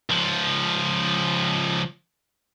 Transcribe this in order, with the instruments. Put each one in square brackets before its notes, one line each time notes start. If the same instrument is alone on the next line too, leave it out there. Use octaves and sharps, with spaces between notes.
[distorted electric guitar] C#2 F3